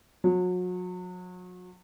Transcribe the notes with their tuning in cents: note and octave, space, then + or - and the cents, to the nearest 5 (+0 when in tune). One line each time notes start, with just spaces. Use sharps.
F#3 -35